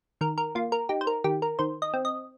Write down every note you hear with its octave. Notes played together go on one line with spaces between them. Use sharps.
D#3 A#4
A#4
A#3 F4
A#4
D#4 G4
C5
A#4
D#3 G4
A#4
D#3 C5
D#5
C4
D#5